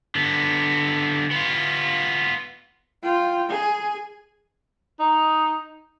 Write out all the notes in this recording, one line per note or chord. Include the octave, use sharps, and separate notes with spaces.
D3 B3
B3 F4
F4 G5
G#4
D#4